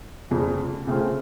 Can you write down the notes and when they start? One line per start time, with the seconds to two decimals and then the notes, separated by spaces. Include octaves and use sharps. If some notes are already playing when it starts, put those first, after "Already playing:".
0.31 F1 F2 C#3
0.87 C#3 A3 C4 F4